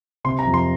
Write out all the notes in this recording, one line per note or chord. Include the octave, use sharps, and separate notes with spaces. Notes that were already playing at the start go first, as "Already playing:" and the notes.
C3 C6
A#5
F2
C6